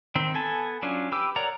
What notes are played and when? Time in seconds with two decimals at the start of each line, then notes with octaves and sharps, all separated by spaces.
0.15 D#3 C4
0.34 B3 A4 G#5 A5
0.83 F#3 C#4 D4 F4
1.12 G4 B4 D6 E6
1.36 A#4 C#5 D5 F#5 A#5